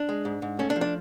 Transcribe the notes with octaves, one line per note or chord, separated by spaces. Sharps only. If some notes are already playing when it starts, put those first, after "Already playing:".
Already playing: D4
G#3
G#2
G#2
A3 C#4
D4
F3
D4